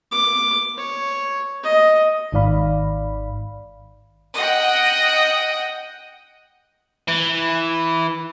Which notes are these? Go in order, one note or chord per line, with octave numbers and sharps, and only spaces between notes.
D6
C#5
D#5
G#1 G#2 D#3 D5 F5 B5
D#5 F#5 G5
E3